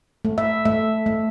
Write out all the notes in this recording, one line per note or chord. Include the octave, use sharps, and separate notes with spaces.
A3
E5
A3 E5
A3